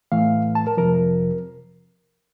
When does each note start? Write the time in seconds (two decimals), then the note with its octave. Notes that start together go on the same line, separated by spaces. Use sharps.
0.12 A2 E3 A3 F5
0.55 A5
0.67 A#4
0.77 F2 C3 F3 A#4